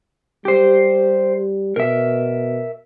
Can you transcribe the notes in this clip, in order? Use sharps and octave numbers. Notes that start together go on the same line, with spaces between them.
G3 G4 C5
B2 A#4 E5